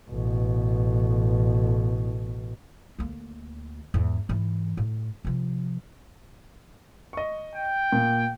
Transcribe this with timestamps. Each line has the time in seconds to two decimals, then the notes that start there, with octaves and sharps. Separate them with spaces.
0.10 A1 B2
2.99 D2 A#3
3.94 E2 G#2
4.29 G#2 E3
4.77 A2
5.25 C3 F3
7.13 D#5 C#6
7.55 G5
7.92 A#2